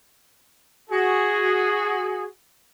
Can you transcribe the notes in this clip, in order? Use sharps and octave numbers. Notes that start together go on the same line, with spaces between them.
F#4 G#4